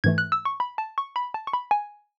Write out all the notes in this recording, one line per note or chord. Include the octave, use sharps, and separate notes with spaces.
G#2 E3 A3 G#6
F#6
E6
C#6
B5
A5
C#6
B5
A5
C#6
B5
G#5